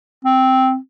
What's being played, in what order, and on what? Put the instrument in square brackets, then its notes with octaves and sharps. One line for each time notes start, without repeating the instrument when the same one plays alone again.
[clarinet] C4